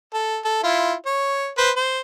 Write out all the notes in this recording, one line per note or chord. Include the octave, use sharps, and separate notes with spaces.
A4
A4
E4 F4
C#5
B4 C5
C5